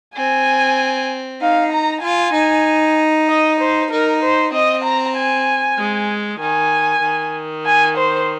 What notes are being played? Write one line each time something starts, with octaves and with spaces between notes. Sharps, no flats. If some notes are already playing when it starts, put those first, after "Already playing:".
C4 G#5
D#4 F5
A#5
F4 G#5
D#4
D#5
C5
D#4 A#4
C5
C4 D#5
A#5
G#5
G#3
D#3 G#5
D#3
G#5
C5